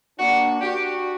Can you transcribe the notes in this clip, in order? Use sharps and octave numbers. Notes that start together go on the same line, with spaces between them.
A#3 D4 F#4
D4 F#4 G4